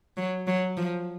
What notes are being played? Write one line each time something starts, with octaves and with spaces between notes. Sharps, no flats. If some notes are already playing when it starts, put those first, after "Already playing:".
F#3
F#3
F3